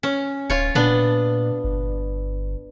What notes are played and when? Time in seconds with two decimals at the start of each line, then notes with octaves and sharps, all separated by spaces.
0.03 C#4
0.50 D1 F4 C#5
0.75 A#2 B3 D4
1.64 G1